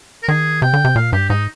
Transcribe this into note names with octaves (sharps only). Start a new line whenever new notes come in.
A#4
D#3 G#4
C3 G5
D3
C3
A#2 F5
G2 G4
G#2 D#4